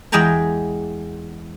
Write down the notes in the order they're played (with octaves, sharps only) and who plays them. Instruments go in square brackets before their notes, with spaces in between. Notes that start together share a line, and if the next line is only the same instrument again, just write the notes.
[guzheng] E2 G#3 G#4 G5 A#5 B5